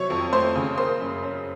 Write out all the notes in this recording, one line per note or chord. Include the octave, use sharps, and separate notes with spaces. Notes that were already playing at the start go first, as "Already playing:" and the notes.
Already playing: C3 F#3 C#5 C#6
F2
A3 C5 C6
C#3
A#3 C5 C6
F#2
C#4